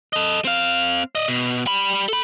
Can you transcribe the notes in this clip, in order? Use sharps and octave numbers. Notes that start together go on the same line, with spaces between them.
A4 D#5
C4 F5
D5 D#5
B2
G3 B5
A4 B5